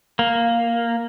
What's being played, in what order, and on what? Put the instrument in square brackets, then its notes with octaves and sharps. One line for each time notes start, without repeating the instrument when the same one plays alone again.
[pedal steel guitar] A#3